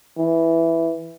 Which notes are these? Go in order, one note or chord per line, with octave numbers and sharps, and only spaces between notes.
E3